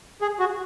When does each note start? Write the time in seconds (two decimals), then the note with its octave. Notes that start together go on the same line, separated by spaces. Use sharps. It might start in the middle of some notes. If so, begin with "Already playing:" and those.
0.22 G#4
0.40 F#4